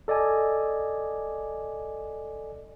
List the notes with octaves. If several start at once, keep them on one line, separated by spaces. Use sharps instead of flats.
A4 D5 D#5 G#5